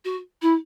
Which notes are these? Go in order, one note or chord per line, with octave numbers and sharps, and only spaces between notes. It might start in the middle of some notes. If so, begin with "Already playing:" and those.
F#4
E4